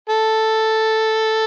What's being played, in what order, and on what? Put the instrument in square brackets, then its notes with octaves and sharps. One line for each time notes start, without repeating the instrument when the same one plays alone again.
[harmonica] A4